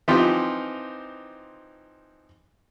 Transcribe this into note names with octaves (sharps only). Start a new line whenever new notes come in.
E3 F3 C4 D#4 F4 G4